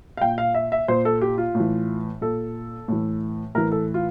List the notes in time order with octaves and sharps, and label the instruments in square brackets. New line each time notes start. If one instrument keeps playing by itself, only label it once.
[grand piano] F5
A#2 G5
F5
E5
E5
A#2 C5
A4
G4
F4
A2
E3
A#2 A4
A2 E3
A2 E3 A#4
A4
F4